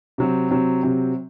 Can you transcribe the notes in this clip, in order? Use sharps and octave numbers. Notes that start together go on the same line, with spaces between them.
C3 F#3 C4
C3 F#3 C4
C3 F#3 C4